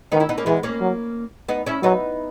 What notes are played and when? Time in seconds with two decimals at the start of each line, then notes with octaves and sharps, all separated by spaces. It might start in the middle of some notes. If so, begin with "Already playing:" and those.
0.12 D#3 B3 D#4
0.20 C#4 E4
0.29 B3 D#4
0.38 A#3 C#4
0.46 E3 G#3 B3
0.63 A#3 C#4
0.81 F#3
1.48 B3 D#4
1.67 C#4 E4
1.83 F#3 B3 D#4